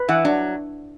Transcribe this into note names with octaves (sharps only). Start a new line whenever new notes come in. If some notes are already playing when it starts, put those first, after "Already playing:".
Already playing: B4
E3 F#5
F#3 D4